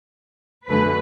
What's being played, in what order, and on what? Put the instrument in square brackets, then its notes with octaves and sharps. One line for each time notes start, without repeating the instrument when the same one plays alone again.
[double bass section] F#2 D3 A3 [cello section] B4